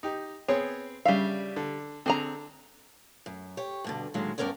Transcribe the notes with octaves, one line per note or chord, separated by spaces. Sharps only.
D#4 G4
B3 C4 G#4 C#5
C#3 G3 D4 E5 F5
D3
D3 C4 G#4 A#5
F#2
G4 C#5
G2 B2 D3
A2 D3 D#3 F#3 G#3 A#3
G2 B3 C#4 A#4 C#5 D5